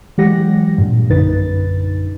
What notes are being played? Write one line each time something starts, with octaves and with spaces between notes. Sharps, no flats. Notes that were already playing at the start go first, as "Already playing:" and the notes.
E3 F#3 G#3 G4 F#5 A#6
G2 A#2
A#1 F#2 D3 D#4 B4 A6